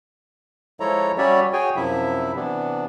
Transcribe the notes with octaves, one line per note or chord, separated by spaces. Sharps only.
F3 G#3 E4 A4 C#5 A#5
G3 C#4 F#4 C#5 D5 E5
F#4 G#4 C#5 G5 G#5
F#2 C3 F3 E4 E5
C3 E3 B3 D4